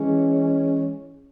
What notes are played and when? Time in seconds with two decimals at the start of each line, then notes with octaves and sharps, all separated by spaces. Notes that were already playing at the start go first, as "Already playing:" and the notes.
Already playing: E3 G#3 C#4